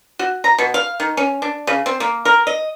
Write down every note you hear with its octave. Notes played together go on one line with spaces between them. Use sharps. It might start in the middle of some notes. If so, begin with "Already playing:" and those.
F#4
A#5
B2
F5
D#3
C#4
D4
C#3
C4
A#3
A#4
D#5